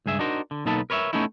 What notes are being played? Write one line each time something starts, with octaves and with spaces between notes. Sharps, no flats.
C#2 G2 G#4 E5
D4 D#4 F#4 A#4 C5
D3
B1 A#3 D#4 A4 B4 A5
A#4 B4 C#5 D5 E5
A3 B3 C#4 D#4 E4